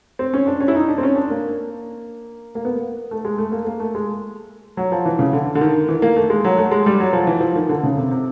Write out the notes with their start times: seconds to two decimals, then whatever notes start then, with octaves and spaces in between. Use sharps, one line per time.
0.19 C4
0.34 C#4
0.47 D4
0.60 C#4
0.68 E4
0.75 D#4
0.89 D4
0.98 C4
1.03 C#4
1.16 D4
1.30 A#3
2.55 A#3
2.65 B3
2.75 A#3
3.11 A3
3.25 G#3
3.38 A3
3.52 A#3
3.67 A#3
3.80 A3
3.95 G#3
4.77 F#3
4.92 F3
5.05 E3
5.19 C#3
5.33 D3
5.55 D3
5.61 D#3
5.88 E3
6.02 A#3
6.16 A3
6.30 G#3
6.44 F#3
6.58 A3
6.71 G#3
6.86 G3
7.00 F#3
7.13 F3
7.27 E3
7.41 F3
7.56 D#3
7.69 D3
7.83 C#3
7.97 C3
8.11 C3